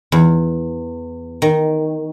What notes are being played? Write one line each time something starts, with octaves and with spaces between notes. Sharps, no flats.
E2
D#3